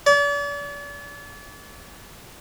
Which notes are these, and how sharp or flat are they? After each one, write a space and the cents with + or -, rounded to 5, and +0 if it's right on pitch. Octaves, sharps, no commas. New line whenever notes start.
D5 -40